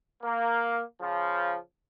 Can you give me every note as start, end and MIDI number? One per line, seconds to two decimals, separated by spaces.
0.22 0.81 58
1.01 1.55 49
1.01 1.55 53